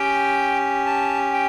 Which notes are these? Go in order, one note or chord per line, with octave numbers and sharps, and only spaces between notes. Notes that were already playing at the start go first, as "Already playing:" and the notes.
Already playing: C#4 G4 G5
A5
G5